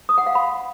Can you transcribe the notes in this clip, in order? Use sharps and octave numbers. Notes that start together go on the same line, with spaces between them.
D#6
F#5
F5
B5